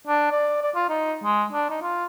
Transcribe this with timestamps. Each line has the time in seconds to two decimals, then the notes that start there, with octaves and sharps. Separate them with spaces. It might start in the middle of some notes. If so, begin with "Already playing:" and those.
0.07 D4
0.31 D5
0.62 D5
0.75 F4
0.89 D#4
1.23 G#3
1.52 D4
1.70 D#4
1.82 F4